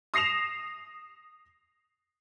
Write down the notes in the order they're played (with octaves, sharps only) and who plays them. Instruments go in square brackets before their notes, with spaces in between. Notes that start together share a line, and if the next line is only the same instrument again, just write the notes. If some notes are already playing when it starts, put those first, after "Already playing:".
[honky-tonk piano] D#6 A#6 C7 E7 F7